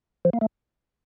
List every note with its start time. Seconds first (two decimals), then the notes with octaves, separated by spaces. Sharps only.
0.25 F3
0.33 A#3
0.41 A3